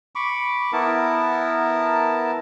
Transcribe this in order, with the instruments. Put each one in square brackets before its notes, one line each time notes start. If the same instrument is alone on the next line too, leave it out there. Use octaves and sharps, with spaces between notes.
[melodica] B5 C#6 D6
B3 E4 A#4 A5